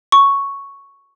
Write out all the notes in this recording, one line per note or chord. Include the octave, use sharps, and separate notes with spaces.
C#6